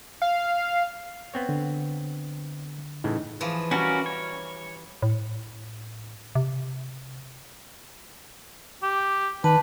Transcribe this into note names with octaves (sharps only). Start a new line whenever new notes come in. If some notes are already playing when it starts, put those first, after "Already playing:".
F5
B3 C4 C#5
D3
A2 C#3 E3 D#4
E3 F3 G#4
G3 C#4 F#4 A#4
C#5
A2
C3
G4
D#3 B4 A5